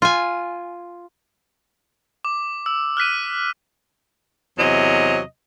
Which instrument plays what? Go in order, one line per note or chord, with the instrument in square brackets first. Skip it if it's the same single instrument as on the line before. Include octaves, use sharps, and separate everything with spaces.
[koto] F4 G#5
[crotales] D6
E6
F6 F#6 B6 D#7
[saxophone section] E2 C3 F#3 D#5